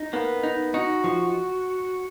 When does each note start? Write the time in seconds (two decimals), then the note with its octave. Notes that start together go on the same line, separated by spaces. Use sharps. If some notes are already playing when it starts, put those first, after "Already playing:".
Already playing: D#4
0.13 A#3 B3
0.43 D#4
0.74 D#4 F#4
1.04 F3